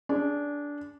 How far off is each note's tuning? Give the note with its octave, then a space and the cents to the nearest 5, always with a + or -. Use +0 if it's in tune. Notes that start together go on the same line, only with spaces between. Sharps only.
D4 -15 G#4 +0